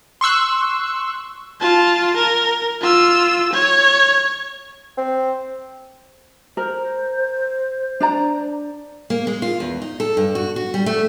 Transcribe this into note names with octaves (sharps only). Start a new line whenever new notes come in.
C6 C#6 E6 F#6
F4 A5
A#4
F4 E6
C#5
C4
A#4 C5
D4 D5 A#5
A#3
G#3
F4
E2
D#4
A4
G2
F#4
F#4
G3
A3